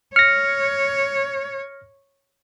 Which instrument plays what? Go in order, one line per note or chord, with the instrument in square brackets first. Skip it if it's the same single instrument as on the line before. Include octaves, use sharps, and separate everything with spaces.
[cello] C#5 [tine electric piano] F6 A#6 [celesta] C#7